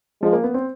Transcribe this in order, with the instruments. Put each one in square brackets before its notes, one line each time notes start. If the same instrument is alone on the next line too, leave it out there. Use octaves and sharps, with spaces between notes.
[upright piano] F3 [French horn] G#3
[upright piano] A#3
B3
C4